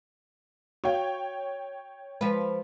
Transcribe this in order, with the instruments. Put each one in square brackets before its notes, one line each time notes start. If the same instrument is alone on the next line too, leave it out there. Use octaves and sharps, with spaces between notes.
[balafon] F#4 F5 [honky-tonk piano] C#5 G5
[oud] F3 B4 [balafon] G#3